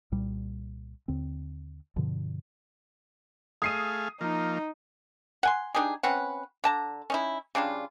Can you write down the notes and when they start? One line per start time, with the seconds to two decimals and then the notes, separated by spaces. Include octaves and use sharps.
0.12 C2 A#2 G3
1.08 D#2 D3 C4
1.96 G2 B2 D3 F3
3.62 A3 G#4 F5 D#6 C7 D#7
4.21 F3 A#3 D#4
5.43 F#5 G#5 C6
5.75 D4 D#4 G4 G#4
6.03 C4 C#4 B4 F#5
6.64 D3 A5 A#5
7.10 C#4 D#4 E4
7.55 C#3 G3 D4 F4